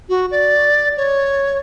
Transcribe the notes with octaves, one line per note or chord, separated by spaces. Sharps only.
F#4
D5
C#5